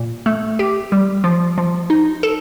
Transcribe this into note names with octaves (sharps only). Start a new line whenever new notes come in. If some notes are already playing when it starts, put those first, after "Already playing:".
Already playing: A#2
A3
G4
G3
F3
F3
D#4
A4